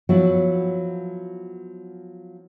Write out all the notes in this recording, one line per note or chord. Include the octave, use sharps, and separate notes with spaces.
F3 F#3 B3 E4